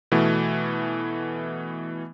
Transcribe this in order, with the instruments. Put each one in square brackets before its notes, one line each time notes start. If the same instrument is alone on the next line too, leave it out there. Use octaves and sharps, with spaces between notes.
[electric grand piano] B2 E3 A3 B3